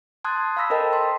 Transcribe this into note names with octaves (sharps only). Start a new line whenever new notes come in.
A5 C6 D#6 F#6 G#6
F5 B5 E6 A#6 B6
A4 A#4 C5 D#5 G5 A5
C6